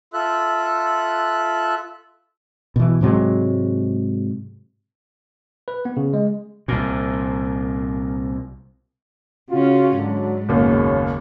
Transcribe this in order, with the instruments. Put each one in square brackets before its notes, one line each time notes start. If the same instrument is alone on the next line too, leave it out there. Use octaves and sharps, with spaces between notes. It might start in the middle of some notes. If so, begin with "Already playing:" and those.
[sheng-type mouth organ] F4 A4 E5 F#6
[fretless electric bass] B2 E3
G#2 C3 F#3 G#3
[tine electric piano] B4
B3
C#3
G#3
[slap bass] C2 A#2
[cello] C#3 C#4 [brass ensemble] F4 F#4
[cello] G#2 [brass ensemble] D3 F#3
[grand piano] F#1 D#2 [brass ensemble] C#3 B3 C#5